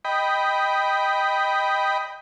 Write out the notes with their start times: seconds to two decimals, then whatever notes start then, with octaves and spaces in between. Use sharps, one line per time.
0.05 D#5 G5 B5